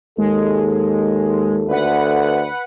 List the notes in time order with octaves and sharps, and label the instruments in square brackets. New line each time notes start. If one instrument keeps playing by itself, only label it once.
[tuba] D#2 [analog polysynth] G#3 [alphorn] A4
[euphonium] D2 [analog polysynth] B4 F#5